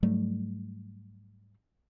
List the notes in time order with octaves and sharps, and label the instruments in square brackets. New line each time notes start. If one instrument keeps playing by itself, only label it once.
[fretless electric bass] G#2 F#3 G3 A3